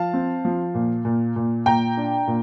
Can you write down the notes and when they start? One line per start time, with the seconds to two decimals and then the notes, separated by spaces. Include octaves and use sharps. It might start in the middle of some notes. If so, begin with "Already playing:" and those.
Already playing: F3 F5 A5
0.13 C4
0.45 F3
0.74 A#2
1.05 A#2
1.36 A#2
1.66 A#2 G5 A#5
1.97 D4
2.27 A#2